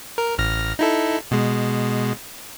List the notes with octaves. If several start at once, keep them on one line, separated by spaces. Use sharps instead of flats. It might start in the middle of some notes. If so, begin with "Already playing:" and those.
A#4
A1 F6 A#6
D#4 E4 A4
B2 G#3